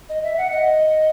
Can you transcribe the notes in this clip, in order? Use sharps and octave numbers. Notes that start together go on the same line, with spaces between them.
D#5
E5
F#5
D#5